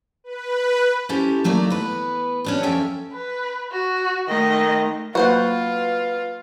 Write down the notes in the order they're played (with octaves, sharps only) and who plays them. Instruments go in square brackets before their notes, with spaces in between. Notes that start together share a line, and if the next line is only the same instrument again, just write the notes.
[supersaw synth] B4
[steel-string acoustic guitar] C#4 E4 G4 A4 C5
F#3 A3 A#3 D#4 D5
B3 B4
C#4 D4 G4
F2 F3 C#4 A4 E5 G5
[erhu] B4
F#4
[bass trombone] D#3 [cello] A3 [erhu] D#5
[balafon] F#3 A#3 [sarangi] F4 [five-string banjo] F#4 C5 F#5 [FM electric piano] B4